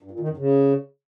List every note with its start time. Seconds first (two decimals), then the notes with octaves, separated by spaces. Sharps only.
0.02 G2
0.11 A#2
0.20 D#3
0.28 F#2
0.37 C#3